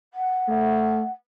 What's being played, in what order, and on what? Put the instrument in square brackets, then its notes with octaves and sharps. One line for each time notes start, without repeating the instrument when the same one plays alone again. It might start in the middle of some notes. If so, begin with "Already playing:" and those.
[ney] F#5
[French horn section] A3